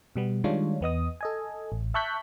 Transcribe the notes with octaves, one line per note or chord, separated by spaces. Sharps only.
B2 G3 B3
D#3 G3 G#3 D4 F4 C#5
E2 B3 D#5 D#6
A4 D#5 G#5
A1
E5 A5 C#6 F#6 G6 B6